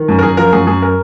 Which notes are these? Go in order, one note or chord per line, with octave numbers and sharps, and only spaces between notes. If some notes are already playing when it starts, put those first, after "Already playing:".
Already playing: D#3
F#2
A#4
F#2 G#4
F3 A#4
F#2 G#4
F#2 G#4
A#4